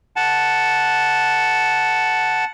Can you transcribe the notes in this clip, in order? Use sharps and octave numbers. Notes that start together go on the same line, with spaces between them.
F#5 A5